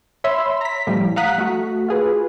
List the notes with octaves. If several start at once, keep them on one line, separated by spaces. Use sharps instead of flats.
C#5 E5 B5 C6 E6
A#5 B6
A2 F3 G3
F5 F#5 A#5 D#6 F#6 B6
A3 F#4
F4 G#4 B4